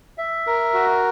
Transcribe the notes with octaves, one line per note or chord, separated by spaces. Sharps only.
E5
A#4
F#4